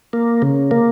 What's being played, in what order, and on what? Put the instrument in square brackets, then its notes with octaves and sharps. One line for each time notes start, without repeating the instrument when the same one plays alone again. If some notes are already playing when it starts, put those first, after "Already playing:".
[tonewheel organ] A#3
C#3
A#3